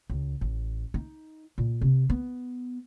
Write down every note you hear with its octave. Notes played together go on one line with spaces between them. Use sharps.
C#2
A1
D#4
A#2
C3
B3